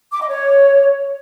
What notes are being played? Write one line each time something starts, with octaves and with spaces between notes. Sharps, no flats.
D6
D#5
C#5